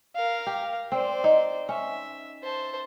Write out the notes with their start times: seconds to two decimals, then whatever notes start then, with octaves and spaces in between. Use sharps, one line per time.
0.15 A#4 F5
0.47 G4
0.92 C4 C5 D5
1.24 D#4
1.69 C#4 E5
2.43 C5 A5